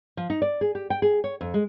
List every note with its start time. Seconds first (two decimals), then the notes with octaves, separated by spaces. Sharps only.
0.17 F3
0.30 D#4
0.42 D5
0.61 G#4
0.75 G4
0.90 G5
1.02 G#4
1.24 C#5
1.41 F2
1.54 G#3